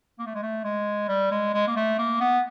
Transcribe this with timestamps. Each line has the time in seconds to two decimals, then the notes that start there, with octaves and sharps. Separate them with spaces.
0.19 A#3
0.26 A3
0.34 G#3
0.42 A3
0.64 G#3
1.09 G3
1.31 G#3
1.54 G#3
1.68 A#3
1.76 A3
1.98 A#3
2.20 B3